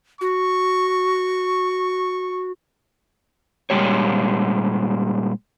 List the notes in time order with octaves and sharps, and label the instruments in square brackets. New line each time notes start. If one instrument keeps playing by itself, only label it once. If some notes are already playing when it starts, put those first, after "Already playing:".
[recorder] F#4 [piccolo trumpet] C#6
[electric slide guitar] A#2 G3 G#3 G4 C#5